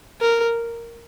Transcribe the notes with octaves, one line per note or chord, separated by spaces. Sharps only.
A#4